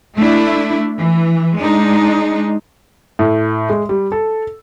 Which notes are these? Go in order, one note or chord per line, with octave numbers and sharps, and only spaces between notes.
A3 D4 E4
E3
G#3 D4 D#4
A2
G#3
G3
A4